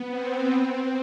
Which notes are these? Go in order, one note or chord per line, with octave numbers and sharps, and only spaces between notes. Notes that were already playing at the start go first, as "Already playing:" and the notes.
Already playing: B3
C4
C4